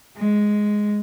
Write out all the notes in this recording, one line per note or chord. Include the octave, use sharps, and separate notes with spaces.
G#3